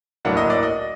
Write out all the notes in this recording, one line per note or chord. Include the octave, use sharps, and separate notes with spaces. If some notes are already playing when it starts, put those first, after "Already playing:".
A2 F#3 A#3 D4 F#5
D#5
D5
D#5